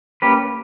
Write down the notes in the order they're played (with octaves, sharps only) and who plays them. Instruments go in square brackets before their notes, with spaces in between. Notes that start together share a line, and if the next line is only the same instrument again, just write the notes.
[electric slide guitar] A#3 C#4 G4 B4